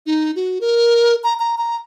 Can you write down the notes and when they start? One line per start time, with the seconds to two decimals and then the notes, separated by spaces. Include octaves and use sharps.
0.06 D#4
0.36 F#4
0.61 A#4
1.24 A#5
1.39 A#5
1.58 A#5